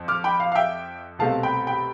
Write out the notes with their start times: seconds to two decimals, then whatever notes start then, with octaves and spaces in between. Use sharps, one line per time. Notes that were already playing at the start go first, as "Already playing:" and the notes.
Already playing: F2
0.08 D6 F6
0.24 G5 B5
0.40 F5
0.52 F5
0.55 E5 G5
1.19 C2 B2 A3 C4 F5 A5
1.43 G5 B5
1.67 G5 B5